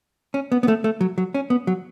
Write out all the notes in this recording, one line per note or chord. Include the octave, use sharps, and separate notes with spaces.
C#4
B3
B3
A3
A3
F#3
F#3
C#4
B3
F#3